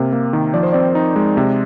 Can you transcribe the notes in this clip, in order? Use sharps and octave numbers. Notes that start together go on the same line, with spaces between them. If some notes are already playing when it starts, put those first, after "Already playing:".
Already playing: C3 A#3 A#4
A#3
D#3
F3 D5
C5
C4 D5
D#4
G#3
C3